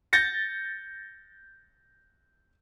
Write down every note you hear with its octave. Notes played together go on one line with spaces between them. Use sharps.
G6 A6 A#6 C#7